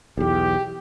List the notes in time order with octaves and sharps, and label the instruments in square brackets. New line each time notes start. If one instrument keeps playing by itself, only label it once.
[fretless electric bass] B1 E2 [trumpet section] G4